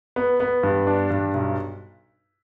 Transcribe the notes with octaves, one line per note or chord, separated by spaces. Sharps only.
B3
B3
G2
D4
G2
B1